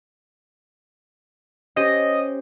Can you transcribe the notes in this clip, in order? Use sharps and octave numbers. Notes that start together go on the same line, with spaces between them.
C#4 G4 C5 D#5